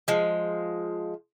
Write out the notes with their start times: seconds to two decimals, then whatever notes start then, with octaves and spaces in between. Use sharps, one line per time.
0.08 F3 G#3